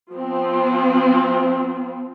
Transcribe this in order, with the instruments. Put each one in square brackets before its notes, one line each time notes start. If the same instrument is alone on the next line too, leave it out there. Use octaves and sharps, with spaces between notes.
[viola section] F3 B3 C4